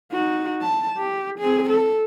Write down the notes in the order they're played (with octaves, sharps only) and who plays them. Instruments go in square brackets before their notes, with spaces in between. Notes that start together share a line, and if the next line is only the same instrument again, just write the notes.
[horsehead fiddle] D#4 F#4
A5
G4
C4 G#4
A4